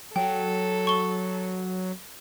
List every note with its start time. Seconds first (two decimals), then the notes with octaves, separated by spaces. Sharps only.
0.16 F#3 A4 G5
0.87 C#6 G7